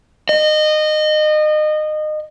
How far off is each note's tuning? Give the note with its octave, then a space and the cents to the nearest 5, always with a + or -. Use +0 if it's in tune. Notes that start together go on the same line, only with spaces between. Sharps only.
D#5 -25